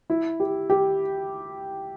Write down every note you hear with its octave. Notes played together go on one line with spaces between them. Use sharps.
E4
G4
G4